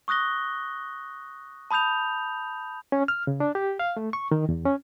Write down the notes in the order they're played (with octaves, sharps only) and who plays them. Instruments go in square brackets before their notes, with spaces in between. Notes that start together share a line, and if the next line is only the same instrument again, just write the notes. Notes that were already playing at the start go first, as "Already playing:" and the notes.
[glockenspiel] C#6 D#6 F#6 A#6 G7
A5 B5 D#6 G6 F7
[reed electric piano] C#4
F6
C#3
D4
G4
F5
A3
C#6
D#3
E2
C#4